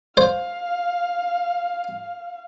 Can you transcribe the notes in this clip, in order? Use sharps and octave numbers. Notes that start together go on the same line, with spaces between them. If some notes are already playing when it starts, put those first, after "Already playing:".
C5 F5